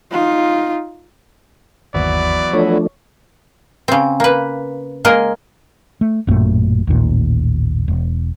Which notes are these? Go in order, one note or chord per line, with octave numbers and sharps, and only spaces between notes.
D#4 F4
G1 D#2 E3 F#3 B3 D5
F3 A3 D4 C#5
C#3 C4
A#3 B4
G#3 A#3 A#4 D#5
A3
A1 F#2 A#2 A3
A1 D#2 A#2
E1